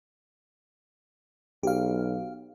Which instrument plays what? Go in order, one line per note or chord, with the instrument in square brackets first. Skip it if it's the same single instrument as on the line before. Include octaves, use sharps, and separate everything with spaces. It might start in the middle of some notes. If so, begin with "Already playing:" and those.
[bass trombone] B1 [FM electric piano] G4 F5